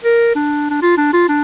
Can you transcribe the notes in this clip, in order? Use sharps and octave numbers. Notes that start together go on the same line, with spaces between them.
A#4
D4
D4
F4
D4
F4
D4